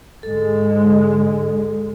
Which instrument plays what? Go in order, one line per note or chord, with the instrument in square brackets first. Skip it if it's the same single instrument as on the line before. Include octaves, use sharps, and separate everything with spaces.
[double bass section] G#2 D3 G#3 [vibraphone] A4